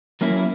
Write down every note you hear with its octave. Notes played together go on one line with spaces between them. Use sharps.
F#3 A#3 C#4 E4